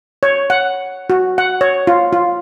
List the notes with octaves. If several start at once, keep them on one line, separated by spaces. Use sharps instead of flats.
C#5
F#5
F#4
F#5
C#5
F4
F4